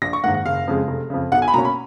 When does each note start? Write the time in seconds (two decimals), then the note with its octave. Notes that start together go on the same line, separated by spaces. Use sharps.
0.02 A#1 A#6
0.13 C#6
0.24 G#2 D#3 A#3 F#5
0.34 F#5
0.46 F#1 F5
0.68 F2 C#3 G#3
0.88 F1
1.10 F2 C#3
1.32 B1 F#5
1.42 G#5
1.48 B5
1.54 B2 A#3 C#4 A#5
1.65 B5